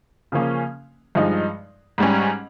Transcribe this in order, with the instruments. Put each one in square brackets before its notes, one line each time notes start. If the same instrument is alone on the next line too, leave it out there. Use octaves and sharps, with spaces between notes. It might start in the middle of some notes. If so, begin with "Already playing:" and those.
[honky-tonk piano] C#3 F3 A#3 C#4
G2 F3 G#3 D#4
G#2 G3 C#4